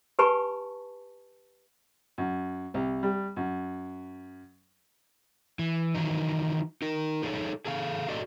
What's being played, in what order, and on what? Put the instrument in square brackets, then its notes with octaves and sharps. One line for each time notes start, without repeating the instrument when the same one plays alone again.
[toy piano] G4 B4 G#5 A5 B5 C#6
[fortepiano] F#2
C2
G3
F#2
[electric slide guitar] E3
D#3 E3 F#3 D#4
D#4 A#4
D#4 G#4 A4 C#5
G#4 A4 F5
F#4 A4 D5 D#5